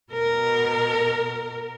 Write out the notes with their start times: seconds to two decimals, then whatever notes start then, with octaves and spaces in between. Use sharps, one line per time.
0.12 B2 A#4